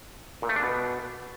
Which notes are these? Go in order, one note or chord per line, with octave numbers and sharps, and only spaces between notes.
A#2
A3
D4
B2